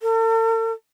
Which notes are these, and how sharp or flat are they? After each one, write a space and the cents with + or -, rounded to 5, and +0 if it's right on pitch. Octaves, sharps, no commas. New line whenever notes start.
A4 +45